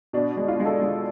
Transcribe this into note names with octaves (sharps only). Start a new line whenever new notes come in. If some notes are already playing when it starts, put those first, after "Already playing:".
B2 D4
G#3
F4
G#3
A4
G#3